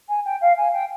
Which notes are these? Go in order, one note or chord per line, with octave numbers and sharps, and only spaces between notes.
G#5
G5
F5
G#5
G5